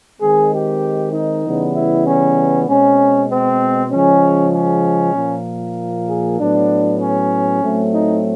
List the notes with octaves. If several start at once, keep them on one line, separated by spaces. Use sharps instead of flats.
D#3 G#3 C4 G#4
G4
D#4
C#3 E3 G3 B3
E4
C#4
B2 G#3 C4 C#4
C4
C#3 F3 G#3 C#4
C#4
A#2 F3 A#3
G#4
A2 F#3 B3 D4
C#4
A2 F#3 A3 C4
D#4